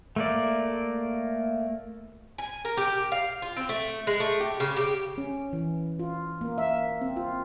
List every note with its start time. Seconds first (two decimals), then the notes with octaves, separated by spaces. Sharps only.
0.16 A3 A#3 D5
2.38 G#5
2.65 A#4
2.77 G4
3.12 F5
3.42 F4
3.57 C4
3.69 A3
4.07 G#3
4.20 A3
4.40 G4
4.60 C#3
4.77 G4
5.18 C#4
5.53 E3
5.99 F4
6.41 A#3
6.58 E5
7.01 C4
7.16 F4